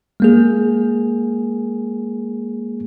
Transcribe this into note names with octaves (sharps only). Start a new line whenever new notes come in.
G#3 A#3 G#4